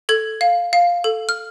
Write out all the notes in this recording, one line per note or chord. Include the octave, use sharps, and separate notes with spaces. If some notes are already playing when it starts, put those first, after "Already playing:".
A4 G#6
F5
F5
A4
F6